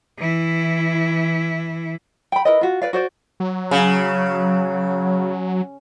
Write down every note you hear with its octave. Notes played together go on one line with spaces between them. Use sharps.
E3 E4
G5 B5
E4 A#4 B4 D#5
F4 F#4
B4 D5 F5
F#4 C5 D5
F#3
C#3